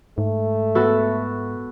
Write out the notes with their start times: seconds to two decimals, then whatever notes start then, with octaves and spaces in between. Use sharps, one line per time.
0.18 G#2 A3
0.75 B3 F#4 A4